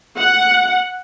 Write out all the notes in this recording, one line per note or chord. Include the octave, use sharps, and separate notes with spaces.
F#5